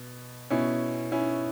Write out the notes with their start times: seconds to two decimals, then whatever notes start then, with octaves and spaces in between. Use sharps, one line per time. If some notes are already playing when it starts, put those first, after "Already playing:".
Already playing: B2
0.50 B2 C#4 E4
1.12 C#4 E4